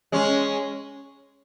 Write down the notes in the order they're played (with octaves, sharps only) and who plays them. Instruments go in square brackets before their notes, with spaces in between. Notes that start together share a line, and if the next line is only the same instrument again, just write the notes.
[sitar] G#3 C#4